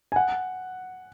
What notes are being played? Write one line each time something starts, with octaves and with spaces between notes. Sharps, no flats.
G#5
F#5